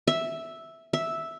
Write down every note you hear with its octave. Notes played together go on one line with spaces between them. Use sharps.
E5
E5